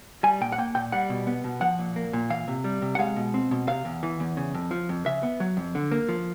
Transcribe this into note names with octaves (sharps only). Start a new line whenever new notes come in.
G3 G#5
A#2 G5
F#5
A#3 G5
A#2 G5
G3 F#5
B2
B3
B2
F3 F#5
A#2
A#3
A#2
E3 F5
C3
G3
C3
F#5
G#3 F5
B2
C4
B2
C3 F5
E2
E3
E2
C#3
F2
F3
F2
C#3 E5
B3
F#3
F2
D3
A#3
F3